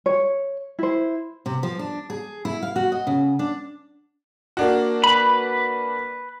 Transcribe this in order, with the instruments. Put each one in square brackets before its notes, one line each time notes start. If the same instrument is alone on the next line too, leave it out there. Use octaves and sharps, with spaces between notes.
[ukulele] C#5
E4 C5
[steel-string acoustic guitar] C3
F3
D4
G#4
E4
F5
F#4
D#5
C#3
D4
[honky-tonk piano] A#3 D4 F#4
[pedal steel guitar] B4 B5